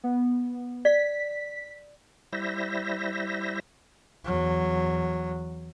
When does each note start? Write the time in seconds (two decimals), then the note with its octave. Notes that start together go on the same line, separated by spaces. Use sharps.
0.04 B3
0.85 D5 B6
2.33 G3 E4 C5 E5 A#6
4.25 E2 F#3